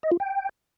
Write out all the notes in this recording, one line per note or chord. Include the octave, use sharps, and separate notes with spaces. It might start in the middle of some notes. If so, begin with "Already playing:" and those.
D#5
F4
G5